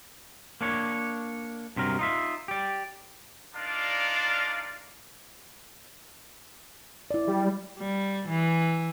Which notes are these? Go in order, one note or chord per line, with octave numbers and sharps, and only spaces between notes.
A#3 D4 C#5
G2 C3 F#3 A#4
D#4 F4 E5
G4 D5
D4 D#4 F4 A#4 D5 F5
E4 D5
G3
G3
E3